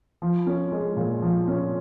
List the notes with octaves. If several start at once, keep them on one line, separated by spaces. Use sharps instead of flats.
F3
C#4
G#3
A#2
F3
C#4